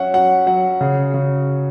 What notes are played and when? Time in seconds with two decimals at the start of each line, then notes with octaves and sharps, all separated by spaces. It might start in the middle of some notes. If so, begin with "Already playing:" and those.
Already playing: F#3 C#4 E5 F#5
0.14 F#3 F#5
0.47 F#3 F#5
0.81 C#3
1.14 C#3